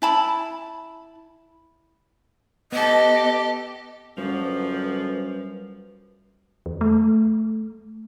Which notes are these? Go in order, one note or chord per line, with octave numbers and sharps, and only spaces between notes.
E4 A5 B5
B3 G4 A4 D#5
F#2 D3 F3 G3 B4 F7
E2
A3